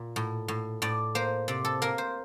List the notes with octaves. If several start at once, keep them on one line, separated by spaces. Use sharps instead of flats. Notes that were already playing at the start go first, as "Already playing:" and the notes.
Already playing: A#2
A2
A2
A2 D5
A#3 C5
C3 D5
A4
A#3 A#4
C5